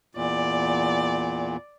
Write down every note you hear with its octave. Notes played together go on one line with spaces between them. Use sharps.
E2 A#2 D5